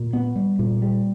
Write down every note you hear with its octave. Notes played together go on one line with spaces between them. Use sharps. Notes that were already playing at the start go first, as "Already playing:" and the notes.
Already playing: A#2
B3
G3
A#2
G3